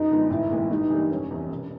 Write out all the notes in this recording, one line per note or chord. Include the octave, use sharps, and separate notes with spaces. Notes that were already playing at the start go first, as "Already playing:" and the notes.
Already playing: F#2 D#4
D3 F3 G#3 B3
A1 E4
G#2 E3 G#3 B3
G2 D#4
E3 G3 A#3 D4
F1 C#4
E2 C3
E1